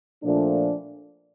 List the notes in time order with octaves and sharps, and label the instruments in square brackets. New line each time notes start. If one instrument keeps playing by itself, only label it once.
[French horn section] A#2 F3 A3 D4